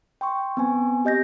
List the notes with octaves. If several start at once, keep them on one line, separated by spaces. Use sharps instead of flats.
G5 C6 C#6
B3 C4 G#5
G4 D#5 G6 A#6